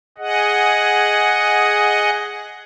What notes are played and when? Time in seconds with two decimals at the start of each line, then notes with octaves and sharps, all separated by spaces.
0.18 G#4 D#5 F#5